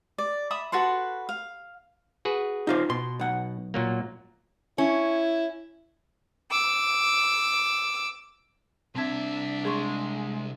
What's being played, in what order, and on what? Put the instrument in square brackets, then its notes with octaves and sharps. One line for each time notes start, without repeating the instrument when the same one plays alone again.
[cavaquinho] D5
E5 B5 D#6
F#4 A4 B4 C6
F5
[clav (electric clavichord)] F#4 G#4 B4
[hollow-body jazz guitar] D#4 F4 C5
[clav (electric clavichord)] B2 [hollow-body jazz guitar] C6
[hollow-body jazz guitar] B1 F#5
[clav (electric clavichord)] A#2 F#3 A#3
[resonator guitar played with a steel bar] C#4 [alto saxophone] E4
[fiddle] D6 E6
[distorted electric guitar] C2 E5 [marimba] C4 A5 G#6 [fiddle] D4
[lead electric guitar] G#3 [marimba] G#4 C6 C#6